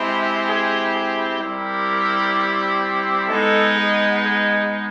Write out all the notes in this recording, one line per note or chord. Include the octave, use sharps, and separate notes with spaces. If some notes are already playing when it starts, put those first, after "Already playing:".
Already playing: G#3 C4 E4 G4
G#4
G#4
G3 C4 E4 G4 A#4
G#3 B3 D#4 A4
G#4
G#4